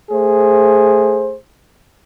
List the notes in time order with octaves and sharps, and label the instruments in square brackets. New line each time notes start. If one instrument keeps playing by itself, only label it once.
[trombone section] A3 G#4 C5